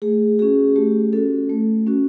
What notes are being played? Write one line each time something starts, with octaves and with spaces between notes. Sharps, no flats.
A3 G#4
C#4 F#4 G#4
A3 G4
C#4 F#4 A4
A3
C#4 F#4